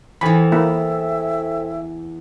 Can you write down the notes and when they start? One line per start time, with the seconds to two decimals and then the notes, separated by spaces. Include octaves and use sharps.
0.21 E2 E3 A4 C5 G5 G#5 B5
0.52 A#3 E4 E5